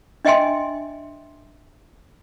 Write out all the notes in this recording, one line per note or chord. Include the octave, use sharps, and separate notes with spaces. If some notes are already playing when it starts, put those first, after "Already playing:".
D4 D#5 E5 G5 G#5 C6